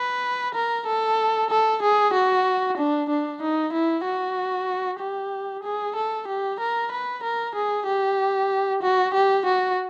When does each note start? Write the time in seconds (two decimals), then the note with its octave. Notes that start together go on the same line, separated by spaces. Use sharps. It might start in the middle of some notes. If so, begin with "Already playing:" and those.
Already playing: B4
0.55 A#4
0.87 A4
1.50 A4
1.82 G#4
2.14 F#4
2.78 D4
3.09 D4
3.42 D#4
3.73 E4
4.05 F#4
5.00 G4
5.64 G#4
5.96 A4
6.28 G4
6.60 A#4
6.92 B4
7.23 A#4
7.55 G#4
7.87 G4
8.83 F#4
9.14 G4
9.46 F#4